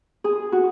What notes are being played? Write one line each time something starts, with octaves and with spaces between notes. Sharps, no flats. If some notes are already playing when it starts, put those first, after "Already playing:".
G#4
F#4